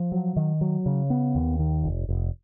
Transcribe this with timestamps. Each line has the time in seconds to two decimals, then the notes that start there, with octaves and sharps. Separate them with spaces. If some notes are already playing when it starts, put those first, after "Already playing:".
Already playing: F3
0.12 F#3
0.36 D#3
0.61 F#3
0.86 C#3
1.10 B3
1.35 D#2
1.59 D#3
1.84 F1
2.09 F1